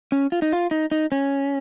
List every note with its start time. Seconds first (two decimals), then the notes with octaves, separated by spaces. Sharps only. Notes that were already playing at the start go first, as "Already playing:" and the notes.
0.12 C#4
0.32 F4
0.42 D#4
0.52 F4
0.71 D#4
0.91 D#4
1.12 C#4